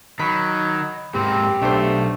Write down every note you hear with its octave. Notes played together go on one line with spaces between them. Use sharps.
D#3 F#3 B5
G#2 A#3 C4 G4
B1 A3 D4 C5